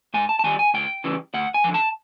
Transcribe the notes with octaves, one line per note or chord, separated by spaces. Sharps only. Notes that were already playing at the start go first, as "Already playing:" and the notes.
G#2 G#5
A5
A5
D#3 G3 G#5
G#5
C#2 G5
C#3 E3 G3
D2 F#5
G#5
D3 F3
A5